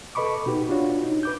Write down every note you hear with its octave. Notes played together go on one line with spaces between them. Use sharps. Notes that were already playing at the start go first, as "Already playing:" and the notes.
A4 B4 D#5 B5 C#6 D6
B2 D#4 F#4 G4 B4
D4 F4 F#4 C#5
D#4
B4 D6 G6